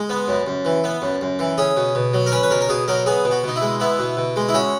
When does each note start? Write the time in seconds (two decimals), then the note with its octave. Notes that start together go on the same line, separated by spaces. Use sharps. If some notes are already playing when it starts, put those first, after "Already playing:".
Already playing: G#3
0.10 B3
0.28 F#2
0.47 F#2
0.65 E3
0.84 B3
1.02 F#2
1.21 F#2
1.39 E3
1.58 C#4 G#4
1.77 B2
1.95 B2
2.14 F#3
2.26 A#4
2.32 C#4 B4
2.43 B4
2.51 B2 A#4
2.61 A#4
2.69 B2 G#4
2.88 F#3 A#4
3.06 B3 G#4
3.25 B2
3.31 F#4
3.43 B2 D#4
3.56 E4
3.62 G#3
3.80 B3 E4
3.99 B2
4.17 B2
4.36 G#3
4.49 E4
4.54 C#4 F#4